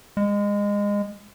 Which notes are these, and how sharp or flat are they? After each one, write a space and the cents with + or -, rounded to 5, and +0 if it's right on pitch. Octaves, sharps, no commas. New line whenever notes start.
G#3 -25